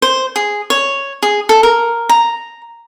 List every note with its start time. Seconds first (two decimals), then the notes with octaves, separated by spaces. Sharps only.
0.02 C5
0.36 G#4
0.70 C#5
1.23 G#4
1.49 A4
1.63 A#4
2.09 A#5